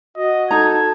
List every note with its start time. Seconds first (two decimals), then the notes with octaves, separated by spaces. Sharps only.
0.16 F#4 D#5
0.51 D#4 A4 A#5 G#6